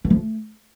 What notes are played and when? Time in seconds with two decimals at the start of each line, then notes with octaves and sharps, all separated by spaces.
0.05 B3
0.10 F3
0.16 A3